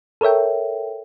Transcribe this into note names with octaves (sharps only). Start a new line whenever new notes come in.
A4 A#4 C#5 E5 G5